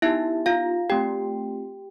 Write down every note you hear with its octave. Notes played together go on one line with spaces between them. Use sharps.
B3 D#4 E4 G4 E5
F4 F5
A3 C4 F4 G4 G5